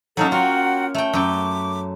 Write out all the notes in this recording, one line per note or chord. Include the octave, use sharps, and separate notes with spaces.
F#3 A#3 C#4 D#4 A4 G6
F4 F#4 F#5 G5
A3 G5
F#2 G5 D6